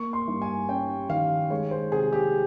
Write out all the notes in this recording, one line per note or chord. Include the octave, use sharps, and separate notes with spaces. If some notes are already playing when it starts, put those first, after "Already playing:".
Already playing: A#3 C#6
C6
G2
G#5
C#4 G5
D#3 F5
G#3 C#5
C5
C3 G#4
G4